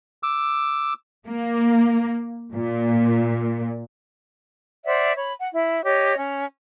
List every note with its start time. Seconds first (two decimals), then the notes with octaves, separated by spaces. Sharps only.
0.23 D6 E6
1.28 A#3
2.54 A#2
4.85 C5 D5 E5 F#5
5.16 C#5 B5
5.39 F#5
5.52 E4
5.83 G4 C#5 D#5
6.17 C#4